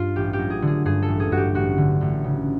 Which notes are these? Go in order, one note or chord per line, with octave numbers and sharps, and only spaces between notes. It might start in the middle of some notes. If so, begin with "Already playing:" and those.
Already playing: G2 F4
A1 G4
G4
F#3
G#4
D3
G#4
G2 G#4
A4
A1
G#4
G2 F#4
G4
A1 F#4
D3
A1
C#3